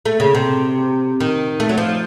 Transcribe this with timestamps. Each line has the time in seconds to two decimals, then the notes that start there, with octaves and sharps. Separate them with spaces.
0.05 A3
0.20 C#3
0.35 C3
1.20 D#3
1.60 A3
1.69 F#3
1.78 F3